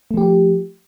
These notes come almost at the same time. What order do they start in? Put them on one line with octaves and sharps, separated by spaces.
A3 F3 G4